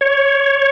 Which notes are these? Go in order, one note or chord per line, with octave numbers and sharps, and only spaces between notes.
C#5